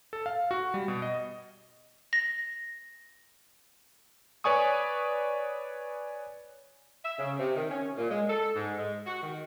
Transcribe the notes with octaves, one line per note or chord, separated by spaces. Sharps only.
A4
F5
F#4
G3
B2
D#5
A#6
B4 C#5 D5 G#5 C#6 D#6
E5
C#3
C3
D#3
C#4
A#2
G#3
A4
G#2
G#3
F#4
D#3